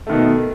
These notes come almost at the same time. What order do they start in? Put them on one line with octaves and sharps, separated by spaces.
A3 D#3 B2